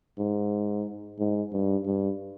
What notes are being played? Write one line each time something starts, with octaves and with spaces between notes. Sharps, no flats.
G#2
G#2
G2
G2